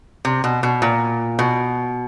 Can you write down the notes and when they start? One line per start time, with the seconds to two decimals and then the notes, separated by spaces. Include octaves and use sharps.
0.25 C3
0.44 B2
0.63 B2
0.82 A#2
1.39 B2